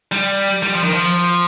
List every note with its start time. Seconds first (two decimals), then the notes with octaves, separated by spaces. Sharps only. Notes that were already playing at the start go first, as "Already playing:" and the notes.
0.12 G3
0.63 G3
0.73 F3
0.84 D#3
0.94 F3